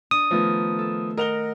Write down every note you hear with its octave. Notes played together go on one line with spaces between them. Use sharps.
D4 D#6
D#3 F3 A3 B3 D#4
A4
A#4 D#5 F#5 F7 G7